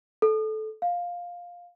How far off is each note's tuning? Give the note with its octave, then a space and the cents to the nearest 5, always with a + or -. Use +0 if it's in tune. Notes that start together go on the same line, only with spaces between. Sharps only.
A4 -20
F5 +10